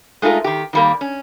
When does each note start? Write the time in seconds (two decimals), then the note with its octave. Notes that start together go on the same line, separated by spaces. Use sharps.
0.22 G#3 A3 D#4 F4 A#4
0.44 D#3 G4
0.73 D#3 G3 A#3
1.01 C#4